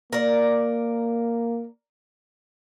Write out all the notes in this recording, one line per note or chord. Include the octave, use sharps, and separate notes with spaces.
A#3 A#4 D5